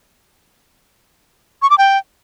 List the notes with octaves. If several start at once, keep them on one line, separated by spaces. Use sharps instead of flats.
C#6
D6
G5